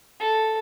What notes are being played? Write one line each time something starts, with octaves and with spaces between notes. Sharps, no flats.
A4